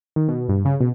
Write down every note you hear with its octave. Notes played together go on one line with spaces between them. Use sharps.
D#3
B2
G2
C#3
B2